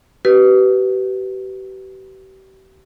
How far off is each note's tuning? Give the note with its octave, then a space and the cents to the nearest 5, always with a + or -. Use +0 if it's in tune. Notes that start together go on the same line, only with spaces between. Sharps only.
G4 -40 B4 +0